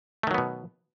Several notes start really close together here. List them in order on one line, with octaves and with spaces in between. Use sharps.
A3 D#3 F#3 B3 B2